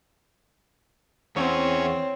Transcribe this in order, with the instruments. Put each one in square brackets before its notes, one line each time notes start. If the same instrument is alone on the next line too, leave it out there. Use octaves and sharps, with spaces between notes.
[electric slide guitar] E2 [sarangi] C4 [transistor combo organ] C#4 [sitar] C#5